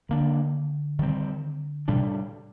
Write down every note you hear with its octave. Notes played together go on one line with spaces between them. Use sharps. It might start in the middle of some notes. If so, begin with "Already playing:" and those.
D3 D#3 A#3 D4
D#3 G3 C4
A2 C3 G3 D4